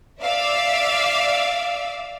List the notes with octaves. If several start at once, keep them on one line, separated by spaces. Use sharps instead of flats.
D5 E5 F5 D6 E6